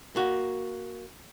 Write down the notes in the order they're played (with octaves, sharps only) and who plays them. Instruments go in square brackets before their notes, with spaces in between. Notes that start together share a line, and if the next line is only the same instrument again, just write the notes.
[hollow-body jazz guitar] A#3 F#4